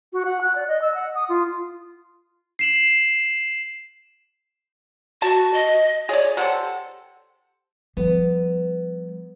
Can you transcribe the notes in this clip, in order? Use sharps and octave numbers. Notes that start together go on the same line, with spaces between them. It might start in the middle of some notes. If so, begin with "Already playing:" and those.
F#4
F#5
F#6
D5
D#5
E6
F#5
D#6
F4
C7 E7 F#7
F#4 A5
D#5
G#4 C#5 D5
C3 C4 A4 F#5
F3 G3 B3